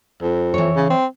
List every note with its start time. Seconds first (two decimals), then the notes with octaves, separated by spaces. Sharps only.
0.22 F2
0.54 E3 C#5
0.76 C#3
0.90 C4